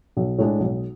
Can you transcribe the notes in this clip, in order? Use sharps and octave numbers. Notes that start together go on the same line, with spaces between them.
B1
A2 G#3 D4 G#4
B1